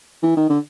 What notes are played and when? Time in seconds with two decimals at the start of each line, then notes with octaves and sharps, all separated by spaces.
0.23 E3
0.37 D#3
0.49 D3